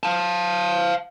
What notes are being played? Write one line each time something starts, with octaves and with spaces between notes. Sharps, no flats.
F5 A5